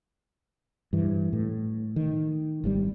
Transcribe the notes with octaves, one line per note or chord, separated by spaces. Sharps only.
G2 E3
A2
D#3
G#1 C3 G3